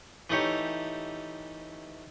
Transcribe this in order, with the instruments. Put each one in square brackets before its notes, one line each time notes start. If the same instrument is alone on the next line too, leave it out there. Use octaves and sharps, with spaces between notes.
[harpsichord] E3 A3 D#4 G4 C#5